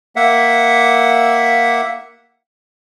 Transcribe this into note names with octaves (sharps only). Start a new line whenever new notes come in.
A#3 E5 F#5